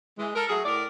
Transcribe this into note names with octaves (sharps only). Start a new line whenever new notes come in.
E3 G#3
A4 A#4
F#3 A3 G#4
A2 A#4 D5